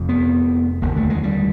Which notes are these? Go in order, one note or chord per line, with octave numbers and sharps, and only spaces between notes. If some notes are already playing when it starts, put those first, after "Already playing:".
Already playing: F1 F2 C3
B3
F1 D#2 D3 A#3
A3
G#3
G3